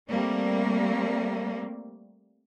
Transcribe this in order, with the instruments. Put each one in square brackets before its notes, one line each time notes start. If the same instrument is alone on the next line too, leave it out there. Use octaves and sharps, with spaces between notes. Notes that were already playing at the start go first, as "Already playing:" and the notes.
[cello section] G3 A3 A#3 C4